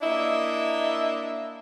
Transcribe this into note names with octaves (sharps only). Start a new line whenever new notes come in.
A#3 D4 E4 D#5 E5